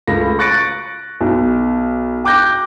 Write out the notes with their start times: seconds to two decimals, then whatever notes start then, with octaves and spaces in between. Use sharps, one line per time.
0.07 C#2 A3 A#6
0.39 C#6 F#6 A6 A#6 C#7 D7
1.21 B1
2.24 G5 D6 F#6 G6 A#6